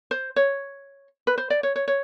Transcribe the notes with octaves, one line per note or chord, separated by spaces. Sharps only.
C5
C#5
B4
C5
D5
C#5
C#5
C#5